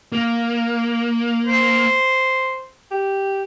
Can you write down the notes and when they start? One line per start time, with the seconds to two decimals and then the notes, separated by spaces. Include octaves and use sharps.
0.12 A#3
1.47 C5
2.91 G4